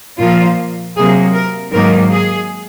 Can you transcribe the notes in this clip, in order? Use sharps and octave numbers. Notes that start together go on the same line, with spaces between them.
A#2 F3 A#3 F4
C3 F#3 A#3 G#4
A#4
G#2 D#3 F#3 A#3 A#4
G#4